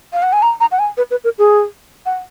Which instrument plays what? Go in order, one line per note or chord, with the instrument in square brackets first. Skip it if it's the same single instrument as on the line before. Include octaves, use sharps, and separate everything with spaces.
[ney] F5
F#5
G#5
A#5
A#5
F#5
G#5
B4
B4
A#4
G#4
F#5